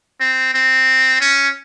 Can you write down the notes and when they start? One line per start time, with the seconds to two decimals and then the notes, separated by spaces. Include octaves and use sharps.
0.21 C4
0.54 C4
1.21 C#4